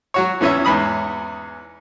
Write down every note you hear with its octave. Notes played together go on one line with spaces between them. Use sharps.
F#3 F#4 C#5
E2 E3 C#4 C#5 E5
E2 G#2 B5 D#6